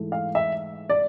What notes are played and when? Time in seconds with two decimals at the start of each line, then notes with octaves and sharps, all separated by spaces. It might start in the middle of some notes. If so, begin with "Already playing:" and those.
Already playing: G#2 E3 A3
0.12 F5
0.35 E5
0.90 D5